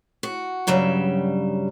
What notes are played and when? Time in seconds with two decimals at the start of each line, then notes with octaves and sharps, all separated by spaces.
0.23 F#4
0.67 G2 C#3 F#3 G3 E5